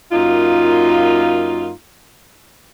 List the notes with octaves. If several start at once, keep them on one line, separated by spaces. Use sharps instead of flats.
F#2 A#3 D#4 F4